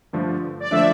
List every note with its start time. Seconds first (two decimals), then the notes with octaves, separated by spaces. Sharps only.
0.13 G2 D3 F3 A3 D4
0.60 D5
0.71 D3 F3 A3 D4 E5